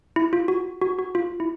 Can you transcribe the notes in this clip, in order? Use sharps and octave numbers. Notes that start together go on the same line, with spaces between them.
E4
F4
F#4
F#4
F#4
F4
E4